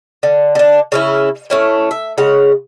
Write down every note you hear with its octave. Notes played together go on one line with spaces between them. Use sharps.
D3
D3 D4
C#3 C#4 E4
A3 C#4 E4
E5
C#3 G#3 C#5 F#5